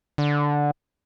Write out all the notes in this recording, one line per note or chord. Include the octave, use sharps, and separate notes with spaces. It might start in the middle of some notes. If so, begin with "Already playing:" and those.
D3